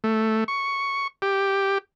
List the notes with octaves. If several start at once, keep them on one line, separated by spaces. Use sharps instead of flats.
A3
C#6
G4